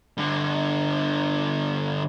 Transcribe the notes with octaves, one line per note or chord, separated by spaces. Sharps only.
G2 D3